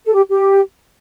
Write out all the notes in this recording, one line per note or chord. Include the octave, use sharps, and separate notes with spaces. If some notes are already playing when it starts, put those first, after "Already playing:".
A4
G4
G4